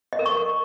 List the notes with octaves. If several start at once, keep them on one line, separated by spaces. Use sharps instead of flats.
D#5
A#4
C#6